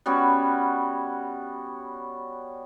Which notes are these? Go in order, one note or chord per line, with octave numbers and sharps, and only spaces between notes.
G3 B3 C#4 F#4